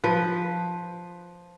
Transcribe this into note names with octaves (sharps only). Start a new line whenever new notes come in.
F3 B4